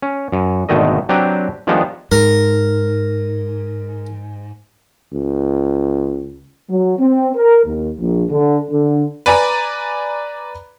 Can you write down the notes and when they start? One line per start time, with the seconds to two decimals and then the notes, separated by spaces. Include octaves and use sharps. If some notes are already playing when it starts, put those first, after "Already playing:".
0.02 C#4
0.32 F#2
0.69 G#1 B2 D3 D#3 A3 D#5
1.09 F#3 C4 D4 G4 B4 A#5
1.67 D#3 F3 G3 G#3 B3 D4
2.12 G#2 A#4
5.13 C#2
6.70 F#3
6.99 C4
7.35 A#4
7.66 D#2
7.99 A#1
8.30 D3
8.70 D3
9.26 B4 D5 G#5 A#5 B5